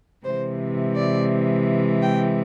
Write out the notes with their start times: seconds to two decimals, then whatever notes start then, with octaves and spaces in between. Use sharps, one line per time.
0.25 C3 E3 G#3 C5
0.95 D5
2.01 G5